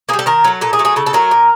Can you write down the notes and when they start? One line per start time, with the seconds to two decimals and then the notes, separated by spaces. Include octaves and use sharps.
0.09 A#3 G#4
0.13 G3
0.19 A4
0.26 D#3 A#4
0.44 F#3 A3
0.61 A#2 A4
0.73 G#4
0.79 F#3 A3
0.85 G#4
0.96 C#3 A4
1.06 A4
1.13 F#3 A3 A#4
1.31 A#2